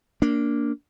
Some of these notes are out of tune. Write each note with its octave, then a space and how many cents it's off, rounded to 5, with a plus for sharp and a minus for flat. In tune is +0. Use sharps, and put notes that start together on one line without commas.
A#3 +0 D4 -15